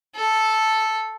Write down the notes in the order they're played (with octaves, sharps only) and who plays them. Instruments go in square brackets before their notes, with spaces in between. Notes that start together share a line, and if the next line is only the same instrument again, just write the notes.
[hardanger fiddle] A4